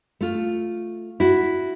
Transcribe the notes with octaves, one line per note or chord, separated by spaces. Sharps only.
A3 F4
E4 F#4